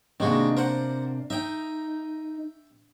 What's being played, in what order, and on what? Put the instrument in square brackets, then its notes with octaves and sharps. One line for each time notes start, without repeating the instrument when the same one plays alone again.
[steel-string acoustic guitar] C3 A#3 D4 [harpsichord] D#3 G#3 F#4
[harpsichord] A#4 C5 F#5
[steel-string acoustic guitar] D#4 [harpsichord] E5 G5